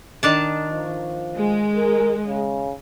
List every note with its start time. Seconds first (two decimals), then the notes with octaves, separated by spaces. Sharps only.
0.23 D#3 D4 A5
0.71 F3
1.38 G#3
1.76 A#4
2.27 C#3